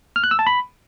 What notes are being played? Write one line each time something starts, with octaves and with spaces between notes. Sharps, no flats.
F6
F#6
E6
A5
B5